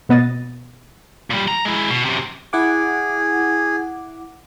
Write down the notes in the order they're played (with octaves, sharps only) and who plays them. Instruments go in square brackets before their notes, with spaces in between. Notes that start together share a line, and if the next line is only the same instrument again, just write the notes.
[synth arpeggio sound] B2 B3 D#5 A6
[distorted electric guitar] A#2 G3
A#5
G#3 E4
B2
F#2 C3
[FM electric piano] E4 F#5 D6 [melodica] G#4